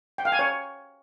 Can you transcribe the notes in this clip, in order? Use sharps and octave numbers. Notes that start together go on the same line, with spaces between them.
G5
F5
G#5
C#5